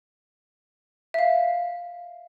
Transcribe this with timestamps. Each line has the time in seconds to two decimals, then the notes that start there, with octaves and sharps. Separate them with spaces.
1.14 E5 F5